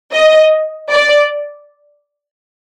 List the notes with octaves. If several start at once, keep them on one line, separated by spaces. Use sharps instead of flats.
D#5
D5